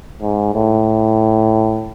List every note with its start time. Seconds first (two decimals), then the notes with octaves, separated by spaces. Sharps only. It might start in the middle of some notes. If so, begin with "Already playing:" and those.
0.22 G#2
0.54 A2